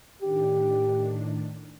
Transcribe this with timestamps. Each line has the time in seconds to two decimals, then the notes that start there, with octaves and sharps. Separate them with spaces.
0.22 A2 D#3 D4 G4